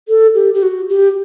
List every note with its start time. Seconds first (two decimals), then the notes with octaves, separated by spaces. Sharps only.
0.08 A4
0.35 G4
0.54 G4
0.63 F#4
0.89 G4